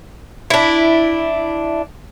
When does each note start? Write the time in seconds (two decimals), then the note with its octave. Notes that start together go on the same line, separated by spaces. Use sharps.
0.50 D4 E4